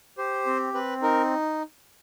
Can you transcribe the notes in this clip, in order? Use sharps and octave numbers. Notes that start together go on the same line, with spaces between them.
G4 C5
C4
C4 B4
D#4 A#4